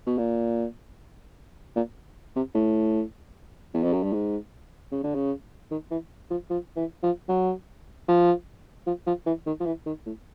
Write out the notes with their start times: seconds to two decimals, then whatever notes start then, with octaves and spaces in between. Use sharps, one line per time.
0.07 B2
0.18 A#2
1.76 A#2
2.36 C3
2.55 A2
3.74 E2
3.83 F2
3.93 F#2
4.03 G2
4.13 G#2
4.92 C#3
5.04 D3
5.15 C#3
5.71 D#3
5.91 E3
6.31 F3
6.50 F3
6.77 E3
7.03 F3
7.29 F#3
8.08 F3
8.87 F3
9.07 F3
9.26 E3
9.46 D#3
9.60 F3
9.66 E3
9.86 D#3
10.06 A2